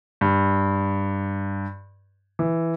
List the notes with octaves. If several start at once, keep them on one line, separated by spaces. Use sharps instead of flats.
G2
E3